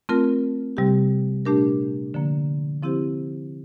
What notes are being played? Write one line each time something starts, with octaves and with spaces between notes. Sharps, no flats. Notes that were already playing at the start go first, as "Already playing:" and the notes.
A3 C4 F4 A#4
C3 G3 C4 G4
A#2 A3 D4 G4 A#4
D3 F3 A#3
F3 C4 E4 G4 C5